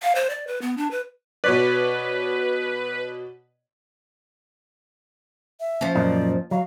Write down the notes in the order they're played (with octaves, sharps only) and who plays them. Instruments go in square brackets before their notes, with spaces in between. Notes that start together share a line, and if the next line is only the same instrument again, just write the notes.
[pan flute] F5
C5
D5
B4
B3
D4
B4
[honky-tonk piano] B2 C#5 D5 [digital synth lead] B4
[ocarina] E5
[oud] F3 C#4
[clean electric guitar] F#2 A#2 D#4 [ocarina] D5
[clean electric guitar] F#3 [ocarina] F5